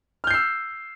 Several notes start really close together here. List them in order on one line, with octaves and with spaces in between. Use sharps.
F6 G6 C7 E6